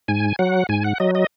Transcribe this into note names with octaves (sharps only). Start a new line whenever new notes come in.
G#2 G#5
F#3 F#5
G#2 G#5
F#5
F#3 D#5
D#5